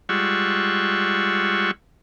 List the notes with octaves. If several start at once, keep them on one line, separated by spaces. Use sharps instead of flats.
G3 G#3 F4 F#5 C#6 E6